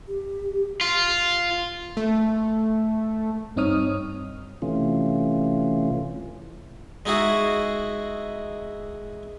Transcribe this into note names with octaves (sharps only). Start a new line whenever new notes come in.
G4
F4
A3
G2 C4 D#4 C#5 D#6 F6
C3 E3 A3 C#4 F4
G#3 D#4 E4 F#4 G#4